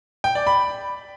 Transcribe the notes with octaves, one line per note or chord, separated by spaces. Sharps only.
G5
D5
B5